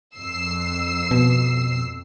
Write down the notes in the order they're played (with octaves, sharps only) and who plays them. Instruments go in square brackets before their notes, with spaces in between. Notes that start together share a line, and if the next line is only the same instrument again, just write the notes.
[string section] F2 E6 C7
[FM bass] B2